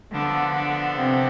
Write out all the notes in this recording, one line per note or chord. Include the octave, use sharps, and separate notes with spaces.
D3 F3 B3 D4 A4
D3
C3